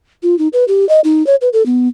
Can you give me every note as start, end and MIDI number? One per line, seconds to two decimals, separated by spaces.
0.23 0.38 65
0.38 0.48 63
0.53 0.65 71
0.68 0.87 67
0.89 1.00 75
1.04 1.25 63
1.27 1.35 73
1.41 1.49 71
1.53 1.65 69
1.66 1.88 59